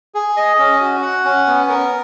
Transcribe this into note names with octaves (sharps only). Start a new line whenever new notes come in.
G#4
D#5
C#4
F#4
F#5
C#4
B3
A#4